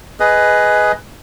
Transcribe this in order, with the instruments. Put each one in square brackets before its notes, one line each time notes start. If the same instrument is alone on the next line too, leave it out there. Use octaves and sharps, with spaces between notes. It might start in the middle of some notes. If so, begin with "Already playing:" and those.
[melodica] G#4 B4 D#5